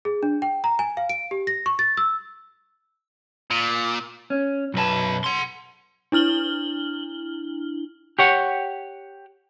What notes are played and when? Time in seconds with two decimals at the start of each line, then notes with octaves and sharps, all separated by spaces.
0.05 G#4
0.23 D4
0.42 G5
0.64 A#5
0.79 G#5
0.97 F5
1.09 D7
1.31 G4
1.47 A#6
1.66 C#6
1.79 A6
1.97 E6
3.51 A#2
4.30 C#4
4.74 B1 F#2 B4 A5
5.24 F#5 C6
6.12 D4 E4 F6 F#7 G7
8.19 G4 C#5 F#5